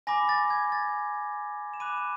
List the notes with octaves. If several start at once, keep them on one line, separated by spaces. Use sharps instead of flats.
G#5 B5 D6 A#6
A6
G#6
A6
E7
B5 D6 F#6 D#7